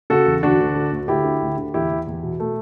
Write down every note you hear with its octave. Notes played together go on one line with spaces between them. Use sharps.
C#3 F#4 A4
E2
D2 D4 F#4
D2
D3
D2
D2 E4 G4
D3
D2
D3
E2 E4 G4
E2
E2
B2
B2 A3